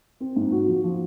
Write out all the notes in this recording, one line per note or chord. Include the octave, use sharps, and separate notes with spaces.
C4
G#2
F#4
F3
F3